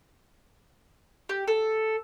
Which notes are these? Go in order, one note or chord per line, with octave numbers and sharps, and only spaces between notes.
G4
A4